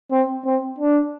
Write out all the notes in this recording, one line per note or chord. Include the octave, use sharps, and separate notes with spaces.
C4
C4
D4